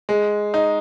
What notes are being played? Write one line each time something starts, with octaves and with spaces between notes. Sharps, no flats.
G#3
D#4